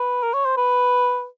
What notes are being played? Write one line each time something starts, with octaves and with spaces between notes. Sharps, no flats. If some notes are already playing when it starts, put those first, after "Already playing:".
Already playing: B4
A#4
C#5
C5
B4